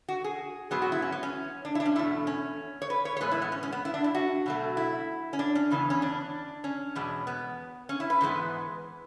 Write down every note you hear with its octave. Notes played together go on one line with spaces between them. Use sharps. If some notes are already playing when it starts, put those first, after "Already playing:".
F#4
G#4
G#2 F#3 B3 G#4
F#4
E4
C#4
B3
C#4
D4
E4
D4
C#4
E2 B2 A3 E4
C#4
C#5
B4
C#5
C#5
A2 E3 G#3 B3 B4
E4
B3
C#4
C#4
B3
E4
D4
E4
F#4
B2 F#3 A3
E4
C#4
D4
C#4
E2 C#3 E3 B3
C#4
D4
C#4
E2 B2 G#3
B3
C#4
E4
B4
G#2 E3 G#3 B3